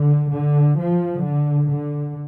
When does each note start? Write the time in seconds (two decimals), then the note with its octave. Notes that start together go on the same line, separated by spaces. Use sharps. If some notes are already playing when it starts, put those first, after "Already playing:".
Already playing: D3
0.31 D3
0.77 F3
1.22 D3
1.68 D3